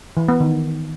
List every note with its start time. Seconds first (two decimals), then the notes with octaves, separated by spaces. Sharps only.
0.17 E3
0.29 B3
0.40 D#3